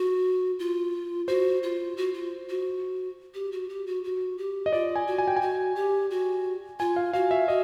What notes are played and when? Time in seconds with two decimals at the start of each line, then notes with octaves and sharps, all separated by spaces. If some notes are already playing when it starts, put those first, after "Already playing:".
Already playing: F#4
0.59 F4
1.28 F#4 C5
1.63 F4
1.97 F#4
2.14 F4
2.49 F#4
3.34 G4
3.52 F#4
3.69 G4
3.87 F#4
4.04 F#4
4.38 G4
4.66 D#5
4.73 F4 D5
4.96 G#5
5.07 F#4
5.18 G#5
5.28 G5
5.37 G#5
5.42 F#4
5.76 G4
6.11 F#4
6.80 F4 G#5
6.96 F5
7.13 F#4 F5
7.31 E5
7.48 F#4 D#5